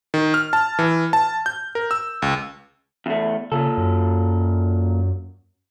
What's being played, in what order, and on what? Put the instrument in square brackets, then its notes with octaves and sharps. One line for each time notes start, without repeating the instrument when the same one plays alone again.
[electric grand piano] D#3
F6
A5
E3
A5
G6
A#4
E6
C#2
[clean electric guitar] E2 A3
[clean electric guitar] A#2 A4 [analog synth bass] C#3
[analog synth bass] F#2